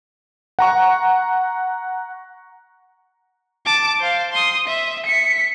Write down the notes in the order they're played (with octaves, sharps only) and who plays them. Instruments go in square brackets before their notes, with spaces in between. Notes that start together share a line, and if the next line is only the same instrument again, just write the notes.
[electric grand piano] F#5 A#5 C#6
[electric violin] A5 D6
C5 F5
C6 D#6
E5
B6 C#7